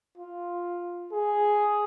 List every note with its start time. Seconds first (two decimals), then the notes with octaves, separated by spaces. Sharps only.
0.18 F4
1.12 G#4